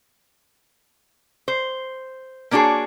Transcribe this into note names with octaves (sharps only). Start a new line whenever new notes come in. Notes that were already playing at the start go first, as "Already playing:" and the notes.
C5
A#3 B3 D4 F#4 G#4 C#5